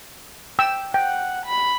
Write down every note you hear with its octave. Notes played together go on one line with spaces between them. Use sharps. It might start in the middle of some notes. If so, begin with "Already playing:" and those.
G5 E6
F#5 G5
B5